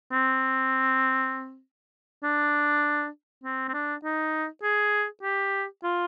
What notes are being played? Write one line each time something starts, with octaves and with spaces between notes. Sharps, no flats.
C4
D4
C4
C4
D4
D#4
G#4
G4
F4